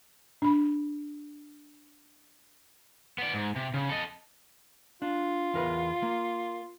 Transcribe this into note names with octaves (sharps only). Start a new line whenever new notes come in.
D4 B5
B3 D5
G#2
C3
C#3
A4 D#5
D4 F4
E2 A#4 B4
A#3